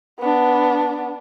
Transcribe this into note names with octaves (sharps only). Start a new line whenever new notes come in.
B3 D4